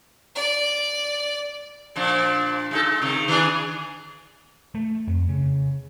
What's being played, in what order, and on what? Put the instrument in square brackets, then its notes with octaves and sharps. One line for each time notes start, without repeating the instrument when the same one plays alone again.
[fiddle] D5
[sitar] A#2 F3 D4
G#3 D#4 A4
G#3
C3 D#3
D#3 D4 G#4
[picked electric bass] A3
F2
C#3